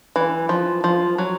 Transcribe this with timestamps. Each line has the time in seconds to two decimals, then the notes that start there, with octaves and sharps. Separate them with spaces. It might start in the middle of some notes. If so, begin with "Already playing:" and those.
0.16 E3
0.49 F3
0.84 F3
1.18 F#3